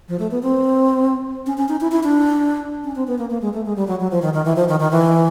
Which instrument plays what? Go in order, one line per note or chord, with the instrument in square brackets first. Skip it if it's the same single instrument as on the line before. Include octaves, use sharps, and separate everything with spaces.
[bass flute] F3
A3
B3
C4
C#4
C#4
D#4
E4
E4
D4
C#4
C4
B3
A#3
A#3
G#3
A3
G#3
G3
F#3
F#3
F3
D#3
D#3
E3
F3
D#3
D#3
E3